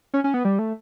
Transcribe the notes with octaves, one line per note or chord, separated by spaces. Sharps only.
C#4
C#4
B3
G3
A3